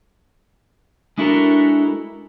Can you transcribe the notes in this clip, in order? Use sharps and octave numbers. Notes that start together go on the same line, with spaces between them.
G#3 D4 E4 F#4 A4 A#4